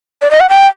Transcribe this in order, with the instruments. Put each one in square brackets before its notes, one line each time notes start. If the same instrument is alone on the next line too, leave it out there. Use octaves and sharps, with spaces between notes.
[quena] D5
D#5
F#5
G5